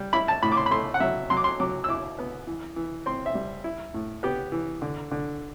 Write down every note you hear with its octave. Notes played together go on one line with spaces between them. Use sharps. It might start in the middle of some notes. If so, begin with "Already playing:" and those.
Already playing: G3
E4 B5
A5
A2 B5
D6
C6
B5
A3 C6
F#5
F#3 E5
F#3 C6
D6
C6
F#3 D6
E6
E4 D6
B3
E3
E3
C4 C6
E5
G3
E4
A2
B3 G4
E3
D3
D3